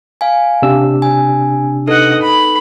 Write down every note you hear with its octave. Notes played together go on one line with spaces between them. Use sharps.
F5 G#5
C3 D4 E6
G#5
D#4 A4 B4 D#5 F#5
B5